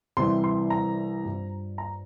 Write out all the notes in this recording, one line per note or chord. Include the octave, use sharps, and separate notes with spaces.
C2 C3 E3 G3 C6
C6
A#5
G2 F3
A#5